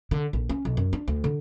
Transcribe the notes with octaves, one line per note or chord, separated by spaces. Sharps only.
D3
A#1
C#4
B1
F#2
D4
D2
D3